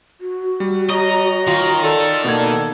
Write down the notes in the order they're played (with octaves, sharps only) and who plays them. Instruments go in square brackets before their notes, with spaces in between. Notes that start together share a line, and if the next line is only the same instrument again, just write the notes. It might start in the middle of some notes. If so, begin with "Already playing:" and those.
[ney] F#4
[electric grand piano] G3
[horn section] C#5 A#5 [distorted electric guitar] D#5
[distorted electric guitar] D#3 [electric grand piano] F4
[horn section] A4 [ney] D5
[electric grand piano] B2 A#3 G#6 [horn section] B3 A4